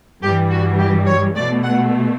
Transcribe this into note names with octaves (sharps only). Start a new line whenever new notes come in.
G2 E3 G3 G4
F#4
G4
C#5
B2 A3 D5
F#5